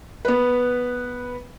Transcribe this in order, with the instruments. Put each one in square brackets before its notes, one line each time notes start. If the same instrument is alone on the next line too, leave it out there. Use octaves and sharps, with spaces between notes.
[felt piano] B3 B4